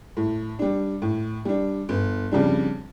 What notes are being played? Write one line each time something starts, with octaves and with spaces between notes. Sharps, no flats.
A2
G3 D4
A2
G3 D4
G1
F2 C#3 G3 D4